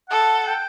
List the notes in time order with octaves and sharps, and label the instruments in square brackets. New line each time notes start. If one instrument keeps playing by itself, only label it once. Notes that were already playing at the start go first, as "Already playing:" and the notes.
[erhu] A4 [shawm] F#5
[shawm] G5